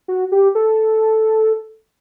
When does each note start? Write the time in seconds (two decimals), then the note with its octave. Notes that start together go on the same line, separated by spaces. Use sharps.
0.08 F#4
0.32 G4
0.55 A4